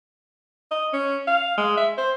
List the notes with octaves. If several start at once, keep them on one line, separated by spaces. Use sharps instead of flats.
D#5
C#4
F5
G#3
E5
C5